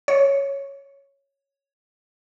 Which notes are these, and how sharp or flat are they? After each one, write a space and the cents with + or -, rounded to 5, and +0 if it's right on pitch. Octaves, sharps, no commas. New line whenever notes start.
C#5 +0